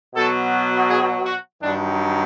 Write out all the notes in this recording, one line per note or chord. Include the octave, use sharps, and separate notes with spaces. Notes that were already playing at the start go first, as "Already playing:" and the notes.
B2 F#3 A4
G#4
F#4
G2 D#3 F#3 D4